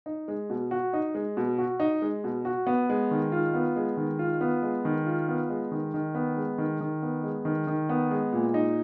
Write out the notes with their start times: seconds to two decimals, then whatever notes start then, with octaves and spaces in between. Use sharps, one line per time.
0.06 D#4
0.28 G#3
0.50 B2
0.71 F#4
0.93 D#4
1.15 G#3
1.37 B2
1.58 F#4
1.80 D#4
2.02 G#3
2.24 B2
2.45 F#4
2.67 B3
2.89 G#3
3.11 D#3
3.32 F4
3.54 B3
3.76 G#3
3.97 D#3
4.19 F4
4.41 B3
4.62 G#3
4.85 D#3
5.06 F4
5.28 B3
5.49 G#3
5.72 D#3
5.94 D#3
6.15 B3
6.37 G#3
6.58 D#3
6.80 D#3
7.02 B3
7.24 G#3
7.45 D#3
7.67 D#3
7.89 B3
8.11 G#3
8.33 A#2
8.54 D#4